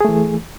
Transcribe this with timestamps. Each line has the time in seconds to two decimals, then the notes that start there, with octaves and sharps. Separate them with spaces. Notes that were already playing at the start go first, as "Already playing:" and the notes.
0.01 G#4
0.05 A3
0.09 E3